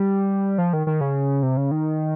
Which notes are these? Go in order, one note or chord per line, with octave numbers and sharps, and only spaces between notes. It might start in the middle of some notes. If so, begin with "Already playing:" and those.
Already playing: G3
F3
D#3
D#3
C#3
C3
C#3
D#3